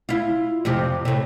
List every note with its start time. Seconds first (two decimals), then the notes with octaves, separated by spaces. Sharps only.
0.09 E4 F4
0.65 F2 C3 G4
1.05 A2 C3